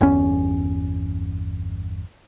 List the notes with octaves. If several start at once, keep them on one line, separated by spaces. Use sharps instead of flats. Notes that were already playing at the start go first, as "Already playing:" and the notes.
G1 E2 C#4